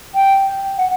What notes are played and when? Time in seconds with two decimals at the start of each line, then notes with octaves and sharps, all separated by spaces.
0.14 G5
0.77 F#5